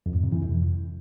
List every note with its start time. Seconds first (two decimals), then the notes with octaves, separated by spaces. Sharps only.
0.06 F2
0.15 G#2
0.24 C3
0.32 E3
0.41 F2